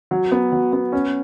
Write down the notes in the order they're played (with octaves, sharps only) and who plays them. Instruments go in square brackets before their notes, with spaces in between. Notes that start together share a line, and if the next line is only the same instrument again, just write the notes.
[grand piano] F#3
B3
F#3
B3
C#4